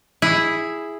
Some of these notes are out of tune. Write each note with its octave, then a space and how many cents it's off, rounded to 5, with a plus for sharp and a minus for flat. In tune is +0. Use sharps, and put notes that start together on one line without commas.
E4 +0 G#4 -5